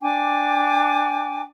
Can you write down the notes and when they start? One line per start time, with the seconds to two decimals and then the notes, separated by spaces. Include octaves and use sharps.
0.01 D4 G5 G#5 D6